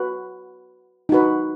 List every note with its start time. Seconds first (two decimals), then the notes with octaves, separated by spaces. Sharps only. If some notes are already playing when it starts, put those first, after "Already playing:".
Already playing: F#4 B4
1.09 D#4 F#4 B4